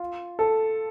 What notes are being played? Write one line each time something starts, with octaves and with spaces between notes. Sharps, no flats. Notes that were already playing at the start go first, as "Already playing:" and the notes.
Already playing: F4
A4